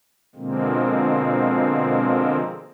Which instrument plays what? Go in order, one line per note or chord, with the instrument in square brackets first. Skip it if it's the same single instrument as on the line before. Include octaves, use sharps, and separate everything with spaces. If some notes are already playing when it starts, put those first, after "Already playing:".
[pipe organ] B2 D3 F3 G#3 A#3 C4